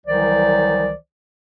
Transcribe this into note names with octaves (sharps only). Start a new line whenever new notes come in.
C2 D#3 E3 F#3 C5 D5